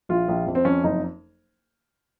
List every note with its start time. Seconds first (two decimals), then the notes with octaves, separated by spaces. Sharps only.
0.09 A#1 F4
0.28 A#1
0.47 F2
0.55 C4
0.65 F2 C#4
0.84 F#1 D#4